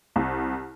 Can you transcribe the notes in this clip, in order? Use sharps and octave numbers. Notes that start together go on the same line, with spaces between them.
C2